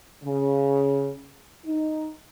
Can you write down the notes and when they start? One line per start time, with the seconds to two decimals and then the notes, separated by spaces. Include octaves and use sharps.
0.24 C#3
1.66 D#4